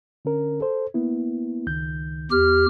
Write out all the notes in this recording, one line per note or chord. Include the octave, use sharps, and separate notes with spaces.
D3 C#4 A#4
A4 C5
A#3 B3 E4
C#2 D#3 G6
E2 G4 F6